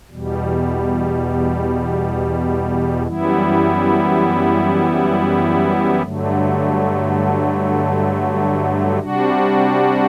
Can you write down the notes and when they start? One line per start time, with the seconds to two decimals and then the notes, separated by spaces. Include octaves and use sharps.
0.11 E2 B2 G3
3.06 F#2 E3 G3 B3 E4
6.03 G2 D3 F#3 A3
8.99 C3 G3 D4 F#4